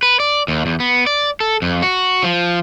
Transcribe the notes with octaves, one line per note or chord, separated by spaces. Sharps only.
B4
D5
D#2
E2
B3
D5
A4
F2
F#4
F3